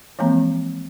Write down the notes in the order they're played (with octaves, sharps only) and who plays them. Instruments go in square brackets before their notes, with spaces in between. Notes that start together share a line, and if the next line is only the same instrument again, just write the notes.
[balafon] E3 F3 G#3 A#3 C4 A#5